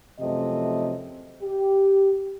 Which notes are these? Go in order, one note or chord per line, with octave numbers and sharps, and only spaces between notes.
F#2 C3 F3 A3 C4 D#5
G4